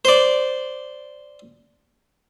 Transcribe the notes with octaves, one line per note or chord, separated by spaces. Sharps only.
C5 D5